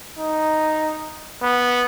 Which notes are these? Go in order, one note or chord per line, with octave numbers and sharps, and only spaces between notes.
D#4
B3